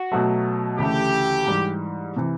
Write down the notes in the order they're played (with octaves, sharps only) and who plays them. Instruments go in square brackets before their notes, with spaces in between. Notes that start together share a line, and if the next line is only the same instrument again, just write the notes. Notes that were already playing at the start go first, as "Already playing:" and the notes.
Already playing: [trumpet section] F#4
[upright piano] B2 F#3 A3
[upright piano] D2 C#3 E3 A3 [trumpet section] G4
[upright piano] G#2 E3 G3
C3 E3